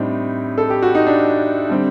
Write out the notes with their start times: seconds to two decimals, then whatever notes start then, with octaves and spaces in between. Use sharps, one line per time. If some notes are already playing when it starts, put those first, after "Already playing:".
Already playing: A2 G3 C4 D4 D#4
0.58 A4
0.70 G4
0.82 F#4
0.95 D#4
1.07 D4
1.69 D3 G3 C4